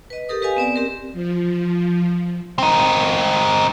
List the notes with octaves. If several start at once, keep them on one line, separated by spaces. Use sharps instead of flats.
B4 D#5
G4 A4 A#4 D#6
G4 B4 D#5 F5 G#5
B3 C4 D5
C4 G4 A#4
F3
C4 D#4